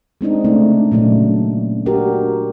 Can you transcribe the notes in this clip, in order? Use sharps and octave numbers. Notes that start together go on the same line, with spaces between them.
G#3 C4 D4 D#4
C#3 A3 D4
A#2 C#3 F#3 A3 D4
D4 F#4 G4 A#4